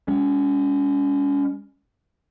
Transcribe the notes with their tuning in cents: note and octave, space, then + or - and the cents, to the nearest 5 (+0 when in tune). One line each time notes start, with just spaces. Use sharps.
G#3 -35 C#4 +25